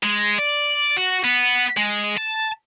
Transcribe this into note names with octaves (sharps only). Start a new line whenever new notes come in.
G#3
D5
F#4
B3
G#3
A5